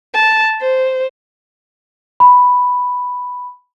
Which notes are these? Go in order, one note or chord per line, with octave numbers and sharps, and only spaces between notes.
A5
C5
B5